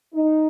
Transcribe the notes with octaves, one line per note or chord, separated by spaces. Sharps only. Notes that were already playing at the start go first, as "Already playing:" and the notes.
D#4